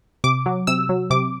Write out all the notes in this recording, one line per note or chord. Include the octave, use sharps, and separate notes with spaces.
C3 D6
F#3
C3 E6
F#3
C3 D6